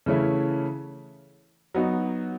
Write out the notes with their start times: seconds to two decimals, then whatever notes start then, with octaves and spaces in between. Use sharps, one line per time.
0.06 C#3 E3 A3 C#4 E4
1.74 F#3 B3 D#4 F#4